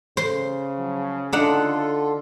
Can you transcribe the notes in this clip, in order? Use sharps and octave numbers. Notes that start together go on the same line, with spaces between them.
C#3 C5 C6
F3 F#3
D3 D4 D#4 F4 A4 F#5